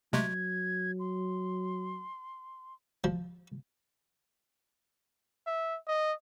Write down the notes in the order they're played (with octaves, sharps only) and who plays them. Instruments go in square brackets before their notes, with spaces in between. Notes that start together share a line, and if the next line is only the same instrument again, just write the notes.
[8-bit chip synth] C3 G#3 A3 [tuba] F#3 [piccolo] G#6
[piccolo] C6
[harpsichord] F3
[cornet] E5
D#5